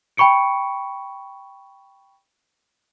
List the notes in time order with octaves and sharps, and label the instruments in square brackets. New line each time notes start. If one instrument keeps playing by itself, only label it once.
[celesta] G5 B5 C#6 C#7 D7